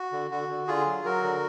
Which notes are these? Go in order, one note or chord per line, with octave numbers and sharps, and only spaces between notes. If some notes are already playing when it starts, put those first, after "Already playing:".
Already playing: F#4
D3
D3 F#4
D3
D3 F4 G#4
F#3
F#3 F#4 A#4
D3